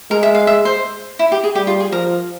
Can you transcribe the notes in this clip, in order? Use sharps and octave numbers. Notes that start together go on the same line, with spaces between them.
G#3 A#4
E5
F5
E5
C5
E4
G4
G#4
G3 G4
F4
G#4
F3 A#4